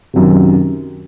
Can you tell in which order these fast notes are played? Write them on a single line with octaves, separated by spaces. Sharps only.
C3 F#2 D#3